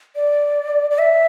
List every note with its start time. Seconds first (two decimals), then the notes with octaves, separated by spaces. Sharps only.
0.16 D5
0.90 D5
0.99 E5